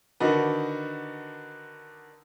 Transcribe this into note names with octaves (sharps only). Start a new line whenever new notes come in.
D3 D#3 D4 D#4 F#4 B4